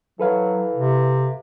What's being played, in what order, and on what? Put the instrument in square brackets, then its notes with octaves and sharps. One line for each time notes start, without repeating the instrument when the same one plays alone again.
[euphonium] E3 [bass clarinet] F#3 [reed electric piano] A4 B4 F5
[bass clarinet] C3